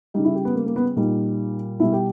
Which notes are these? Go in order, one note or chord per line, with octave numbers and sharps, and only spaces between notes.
C#3 G3 D#4
E4
G4
B3
A#3
A#3
B3
A#2 G3 D#4
B2 G3 E4
G4